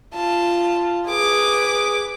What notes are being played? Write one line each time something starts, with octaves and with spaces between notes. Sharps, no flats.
F4 A5
G#4 B4 D6